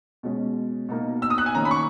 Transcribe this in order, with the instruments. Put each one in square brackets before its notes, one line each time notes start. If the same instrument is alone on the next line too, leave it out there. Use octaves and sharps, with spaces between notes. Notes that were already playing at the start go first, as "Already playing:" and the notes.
[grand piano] B2 G#3 C#4
B2 A#3 D#4
E6
D#6
F#6
G#5
D#3 A#3 C#4 A#5
B5
C#6